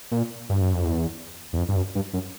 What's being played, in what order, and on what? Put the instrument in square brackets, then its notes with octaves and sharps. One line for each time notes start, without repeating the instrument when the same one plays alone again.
[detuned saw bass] A#2
G2
F#2
F2
E2
E2
F2
G2
F#2
G2
F#2